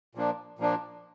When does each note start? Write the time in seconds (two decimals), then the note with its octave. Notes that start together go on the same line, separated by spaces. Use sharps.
0.15 A#2 F3 A#3 D4
0.59 A#2 F3 A#3 D4